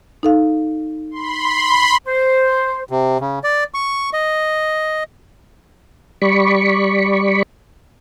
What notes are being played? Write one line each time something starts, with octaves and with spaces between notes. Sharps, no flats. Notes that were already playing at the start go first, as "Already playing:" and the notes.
D#4 A4 F5
B5 C6
C5
C3
C#3
D5
C#6
D#5
G3 D5 B5 C#6